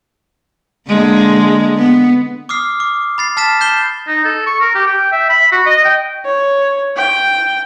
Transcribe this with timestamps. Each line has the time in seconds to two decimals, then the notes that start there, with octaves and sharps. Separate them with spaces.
0.88 D3 G#3 A#3
1.75 B3
2.49 D6 D#6 F6 C7
2.80 D6
3.18 B5 A6 C7
3.37 A5 F6 A6 B6 E7
3.61 G6 C7 E7 G7
4.07 D#4
4.25 A4
4.46 C#6
4.61 A#4
4.75 G4
4.87 G5
5.12 E5
5.29 B5
5.52 F#4
5.66 D#5
5.85 G5
6.25 C#5
6.97 G5